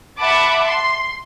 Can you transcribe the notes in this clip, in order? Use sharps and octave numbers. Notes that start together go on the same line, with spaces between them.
E5 F#5 A5 B5 D6
C6